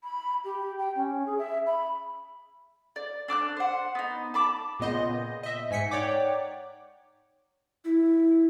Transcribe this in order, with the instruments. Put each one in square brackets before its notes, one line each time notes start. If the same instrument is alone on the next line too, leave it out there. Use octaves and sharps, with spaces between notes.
[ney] B5
G4
G5
C#4
G#4
E5
B5
[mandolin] D5
D4 D6 F6 F#6
C5 F#5
B3 D#4
A5 B5 D6
[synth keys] A#2 C#3 B3 D#5 C6 G6
D#5 E5
G#2 G#5 B6 C#7
D#4 C#5 D5 F#5 G5 D6
[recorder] E4